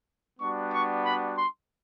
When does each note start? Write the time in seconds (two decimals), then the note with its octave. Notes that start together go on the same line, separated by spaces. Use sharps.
0.39 G3 B3 D4 F#4 C#6
0.71 C#6
1.04 B5
1.36 C6